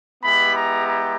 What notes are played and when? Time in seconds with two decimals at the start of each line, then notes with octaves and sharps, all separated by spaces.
0.24 G#3 B3 E4 G4 B5
0.55 A#5
0.88 A#5